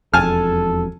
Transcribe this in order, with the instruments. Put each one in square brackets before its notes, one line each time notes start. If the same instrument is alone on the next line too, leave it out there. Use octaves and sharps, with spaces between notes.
[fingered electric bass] E1 F2 [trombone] A4 [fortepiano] G#5 A5 F6